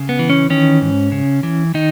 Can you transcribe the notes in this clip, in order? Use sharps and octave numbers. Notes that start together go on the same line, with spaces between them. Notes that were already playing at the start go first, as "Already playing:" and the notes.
Already playing: C#3
B3
E3
C#4
D#3 C#4
G#2
C#3
E3
D#3 D#4